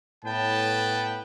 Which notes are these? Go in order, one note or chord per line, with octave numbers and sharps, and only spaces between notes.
A2 B3 B4 G5 A5